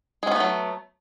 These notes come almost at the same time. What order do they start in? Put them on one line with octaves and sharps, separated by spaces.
G#3 C#4 B3 A3 F#3